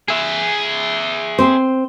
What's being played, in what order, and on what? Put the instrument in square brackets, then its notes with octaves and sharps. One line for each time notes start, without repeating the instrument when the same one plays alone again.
[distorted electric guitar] G#4 E5
[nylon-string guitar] C4 C5